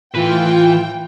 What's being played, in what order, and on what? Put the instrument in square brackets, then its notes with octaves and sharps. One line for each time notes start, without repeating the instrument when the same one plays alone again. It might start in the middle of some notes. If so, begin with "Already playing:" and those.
[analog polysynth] A2 F4 [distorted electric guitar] E3 B4 [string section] G5